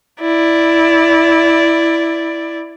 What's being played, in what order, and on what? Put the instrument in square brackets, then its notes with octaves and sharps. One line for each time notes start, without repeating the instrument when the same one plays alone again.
[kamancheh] E4 D5